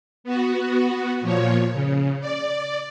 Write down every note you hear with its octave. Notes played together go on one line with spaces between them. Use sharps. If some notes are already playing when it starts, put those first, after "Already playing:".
B3 F#4
A#2 F3 C#5
C#3
D5